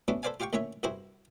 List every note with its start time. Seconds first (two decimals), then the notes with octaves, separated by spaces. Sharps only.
0.08 A3 B3 C#4 D4 E4 F#4
0.23 A4 B4 C5 D5 F5 G#5
0.40 F4 G4 F5 G5 C#6
0.53 D2 A#2 C#4 F4 C#5 E5
0.83 C2 G2 E4 F#4 G#4 C5